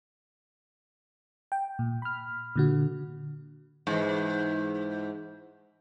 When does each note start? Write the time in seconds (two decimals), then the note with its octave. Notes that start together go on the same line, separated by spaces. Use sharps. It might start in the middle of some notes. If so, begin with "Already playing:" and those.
1.52 G5
1.79 A#2
2.02 B5 F6
2.56 A#2 D3 F#4
3.87 G#2 E3